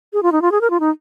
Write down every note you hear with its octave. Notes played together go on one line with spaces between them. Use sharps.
G#4
F4
D#4
F4
G#4
A#4
F4
D#4